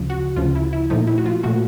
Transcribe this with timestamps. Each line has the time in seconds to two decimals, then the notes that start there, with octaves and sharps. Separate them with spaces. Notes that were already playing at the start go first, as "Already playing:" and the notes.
Already playing: D2 C#3 F3
0.10 F#4
0.36 D2 C#3 F3 F4
0.55 E4
0.73 E4
0.90 A#2 F3 A3 D#4
1.07 E4
1.18 F#4
1.26 F4
1.43 A#2 F3 A3 F#4